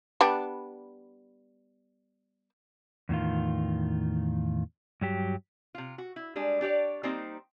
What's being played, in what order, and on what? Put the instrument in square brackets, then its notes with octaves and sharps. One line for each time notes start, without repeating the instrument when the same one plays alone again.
[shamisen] G3 B3 D4
[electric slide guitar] E2 A2 D#3 F4
G2 F#3 G4
[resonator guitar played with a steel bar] C3 F4
F#4
E4
G3 G#3 D4
D4 G4 C#5 D5
G3 A#3 C4 D#4 C5